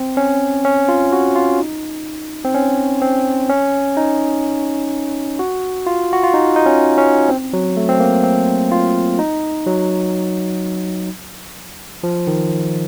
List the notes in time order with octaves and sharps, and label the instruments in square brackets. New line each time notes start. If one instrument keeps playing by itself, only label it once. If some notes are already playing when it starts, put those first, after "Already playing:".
Already playing: [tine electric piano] C4
C#4
C#4
F4
F#4
F4
D#4
C4
C#4
C4
C#4
D#4
F#4
F4
F#4
F4
D#4
D#4
C#4
C#4
C4
F#3
A3
C4
A#3
C4
F4
D#4
F#3
F3
D#3